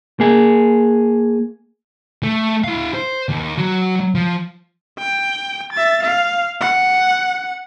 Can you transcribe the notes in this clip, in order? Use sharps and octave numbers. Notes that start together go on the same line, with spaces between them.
A#3 G#4
A3
E4 F5
C5
D#2
F#3 F#4
F3
G5
E5 A6
F5
F#5